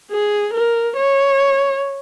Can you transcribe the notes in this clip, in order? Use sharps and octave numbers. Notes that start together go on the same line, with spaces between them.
G#4
A#4
C#5